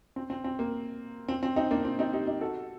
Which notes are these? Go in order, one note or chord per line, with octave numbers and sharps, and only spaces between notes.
C4
C4
C4
A#3
C4
C4
C4 D#4
A#3 D4
C4
C4 D#4
D#4 G4
D#4 G4
F#4 A4